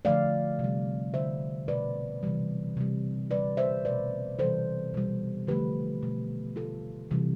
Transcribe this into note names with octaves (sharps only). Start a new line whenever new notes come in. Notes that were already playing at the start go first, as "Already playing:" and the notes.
D3 F3 A3 D5 F5
C3
G3
D3 A3 C5 E5
B2 A3 B4 D5
C3 E3 G3
C3 G3
D3 G3 B4 D5
C5 E5
B2 A3 B4 D5
C3 E3 G3 A4 C5
B2 G3
D3 F3 A3 G4 B4
B2 A3
D3 A3 F4 A4
C3 E3 G3